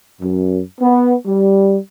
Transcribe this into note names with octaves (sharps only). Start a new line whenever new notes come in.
F#2
B3
G3